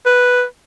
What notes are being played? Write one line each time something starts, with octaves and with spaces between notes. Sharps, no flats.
B4